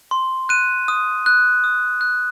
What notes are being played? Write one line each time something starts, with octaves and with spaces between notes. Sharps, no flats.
C6
F#6 D#7
D#6
F#6
D#6
F#6